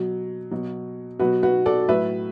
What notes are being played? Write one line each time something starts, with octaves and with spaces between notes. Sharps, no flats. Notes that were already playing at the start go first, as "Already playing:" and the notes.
Already playing: B2 F#3
B2 F#3
B2 F#3 F#4 B4
F#4 B4
A4 D5
A2 F#3 B4 E5